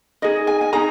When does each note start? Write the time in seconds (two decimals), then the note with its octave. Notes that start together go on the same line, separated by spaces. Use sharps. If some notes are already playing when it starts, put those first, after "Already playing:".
0.22 D#4 G#4 D#5
0.47 G#5
0.61 G#5
0.73 D#4 G#4 A#5